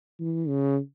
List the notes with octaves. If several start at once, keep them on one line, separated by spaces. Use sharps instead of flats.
E3
C#3